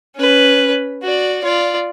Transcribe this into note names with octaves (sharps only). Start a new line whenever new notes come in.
C#4 B4
F#4 D5
F4 D5